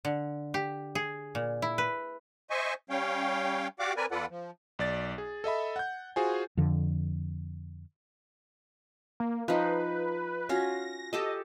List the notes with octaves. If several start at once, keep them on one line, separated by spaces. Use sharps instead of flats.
D3
G4
G#4
A#2
E4
B4
C5 D#5 E5 G#5 C#6
G3 C#4 C#5 F5 G5
F#4 G4 D5 F5 F#5 D6
C4 A#4 B4 D5 G#5
E2 F4 A4 B4 D5 F#5
F3
B1 D5 A6
G#4
A4 D#5 E5 B5
F#5 G6
F4 F#4 G#4 C5 G#5
F2 D3
A#3
F3 D#4 B4
C#4 F4 F#4 A#6
G4 A4 D#5 A5